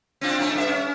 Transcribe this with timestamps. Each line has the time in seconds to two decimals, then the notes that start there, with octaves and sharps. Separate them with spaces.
0.21 C4 D4 F4
0.39 A3 C#4 D#4
0.55 G2 E5
0.68 C#4